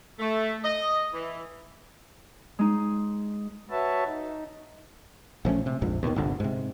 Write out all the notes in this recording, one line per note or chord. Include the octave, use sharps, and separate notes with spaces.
A3
D#5
E3
G#3 D#4
F#4 B4 C#5 E5 A5
D#4
A#1 F3 A3 C#4
C3
A#1 F2 G#2
D#2 B2 D#3
G1 C2 D3
G#2 C3